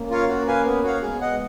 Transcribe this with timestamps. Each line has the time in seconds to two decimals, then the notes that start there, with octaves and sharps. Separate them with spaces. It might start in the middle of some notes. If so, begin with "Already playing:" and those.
Already playing: A#3 C#4
0.10 F4 A#4 C#5 F5
0.29 F#4
0.47 B4 F5 G#5
0.66 B3
0.84 F#4 C#5 F5
1.02 G#3 B3 G#4
1.21 D#5 F#5